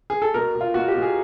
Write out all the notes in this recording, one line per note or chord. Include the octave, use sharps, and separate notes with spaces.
G#4
A4
B2 A#4
B2
F4
B2 F#4
G4
B2
G#4